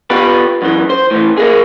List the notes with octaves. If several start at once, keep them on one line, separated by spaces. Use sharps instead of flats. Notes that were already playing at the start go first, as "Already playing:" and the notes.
B3 F4 G4 B4
F#2 E3
C5
A2 E3
A#3 G#4